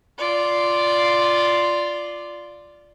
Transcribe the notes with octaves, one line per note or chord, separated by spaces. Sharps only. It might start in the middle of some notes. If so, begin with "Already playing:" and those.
F4 D5